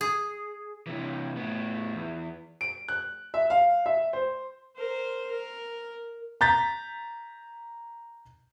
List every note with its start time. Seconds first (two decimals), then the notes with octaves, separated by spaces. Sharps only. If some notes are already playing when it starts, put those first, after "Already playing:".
0.01 G#4
0.86 C3 E3
1.37 A2 B3
1.95 E2
2.61 D7
2.89 F#6
3.34 E5
3.50 F5
3.86 E5
4.13 C5
4.76 A#4 C5
5.31 A#4
6.41 A#5 G6 A6 B6